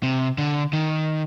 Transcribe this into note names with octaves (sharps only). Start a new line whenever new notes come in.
C3
D3
D#3